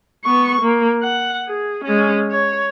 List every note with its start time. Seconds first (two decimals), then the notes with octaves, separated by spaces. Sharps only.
0.24 B3 C#6
0.61 A#3
1.02 F#5
1.48 G#4
1.85 G#3 C#4
2.31 C#5